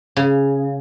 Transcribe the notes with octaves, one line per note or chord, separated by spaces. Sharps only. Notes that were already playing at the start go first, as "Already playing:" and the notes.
C#3